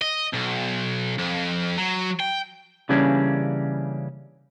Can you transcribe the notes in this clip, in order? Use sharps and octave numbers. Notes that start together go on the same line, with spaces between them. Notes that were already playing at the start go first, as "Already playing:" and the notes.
D#5
B1
F2
F#3
G5
C#3 E3 G3 A#3 C#4 D4